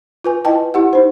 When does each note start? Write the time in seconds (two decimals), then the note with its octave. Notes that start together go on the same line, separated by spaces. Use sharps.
0.24 F4 B4 G#5
0.45 E4 B4 D#5 G5 A5
0.74 E4 G4 F#5
0.93 D#4 C5